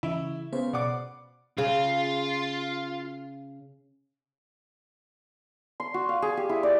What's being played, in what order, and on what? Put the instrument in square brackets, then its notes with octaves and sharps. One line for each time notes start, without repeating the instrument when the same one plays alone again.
[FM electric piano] C#3 E3 [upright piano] E4
[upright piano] C#3 [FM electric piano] B3 G#4 C5
[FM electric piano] B2 [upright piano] D5 F#5 D6
[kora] C#3 [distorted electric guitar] F4
[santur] C6
F#4
F5
G#4
G4
E4
D5